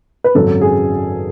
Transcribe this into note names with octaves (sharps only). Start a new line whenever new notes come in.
B4
G#1 F#2 C#3 F#3 A4
G#4